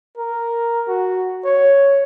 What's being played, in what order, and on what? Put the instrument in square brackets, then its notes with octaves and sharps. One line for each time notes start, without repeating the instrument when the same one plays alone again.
[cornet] A#4
F#4
C#5